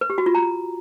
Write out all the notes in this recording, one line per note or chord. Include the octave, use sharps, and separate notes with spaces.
B4
G4
F#4
F4
A#5